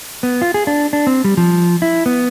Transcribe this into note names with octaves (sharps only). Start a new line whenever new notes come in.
B3
F4
G#4
D4
D4
C4
G3
F3
E4
B3